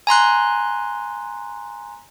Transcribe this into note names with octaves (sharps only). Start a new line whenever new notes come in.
G#5 A#5 C6 F#6